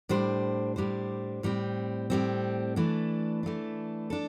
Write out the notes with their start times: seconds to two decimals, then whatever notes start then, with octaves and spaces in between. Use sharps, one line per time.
0.09 A2 G3 D4 C5
0.76 A2 G3 D4 C5
1.43 A2 G3 C4
2.10 A2 G3 C4
2.76 E3 A3 D4
3.43 E3 A3 D4
4.10 D4 A4